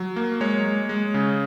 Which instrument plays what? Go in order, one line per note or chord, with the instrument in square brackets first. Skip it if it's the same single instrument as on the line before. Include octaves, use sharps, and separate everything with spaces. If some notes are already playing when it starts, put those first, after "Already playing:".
Already playing: [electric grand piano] F#3
A#3
G#3 C#5
G#3
G#3
C#3